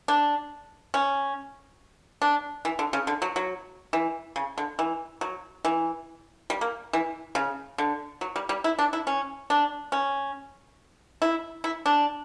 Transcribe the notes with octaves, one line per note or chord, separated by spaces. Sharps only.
D4
C#4
D4
E3
D3
C#3
D3
F#3
F#3
E3
C#3
D3
E3
F#3
E3
G3
A#3
E3
C#3
D3
F#3
G3
G3
E4
D4
E4
C#4
D4
C#4
E4
E4
D4